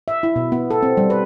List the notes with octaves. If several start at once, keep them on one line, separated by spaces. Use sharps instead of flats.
E5
E4
B2
B3
A4
C4
G3
B4